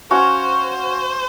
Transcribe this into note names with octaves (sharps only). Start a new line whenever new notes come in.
C#4 F#4 C5 C#5 F5